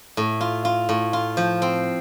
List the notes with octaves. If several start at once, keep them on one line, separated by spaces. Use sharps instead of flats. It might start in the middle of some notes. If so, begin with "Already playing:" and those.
A2
F4
F4
A2
F4
F3
C4